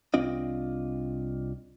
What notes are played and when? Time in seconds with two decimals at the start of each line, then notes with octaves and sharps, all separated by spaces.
0.14 C2 C4 D4 F4 D#5